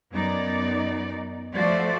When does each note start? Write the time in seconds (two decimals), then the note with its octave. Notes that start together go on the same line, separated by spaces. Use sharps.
0.10 F#2 B3 D#4 D5
1.54 F3 A3 F#4 C5 D5